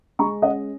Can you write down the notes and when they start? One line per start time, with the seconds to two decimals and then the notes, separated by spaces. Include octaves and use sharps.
0.19 G#3 A#5 C#6
0.42 C#4 D#5 F#5